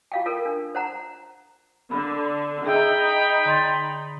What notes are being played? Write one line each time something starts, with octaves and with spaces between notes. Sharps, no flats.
F4 F5 G5
F4 A4 A#4
D4
C5 F#5 A#5
D3 B5
D#4 G#4 E5 G5 B5 E6
D3 C6 A6